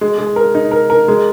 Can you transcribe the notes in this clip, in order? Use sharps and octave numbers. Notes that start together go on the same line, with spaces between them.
G#3
G#3
A#4
D#4
A#4
A#4
G#3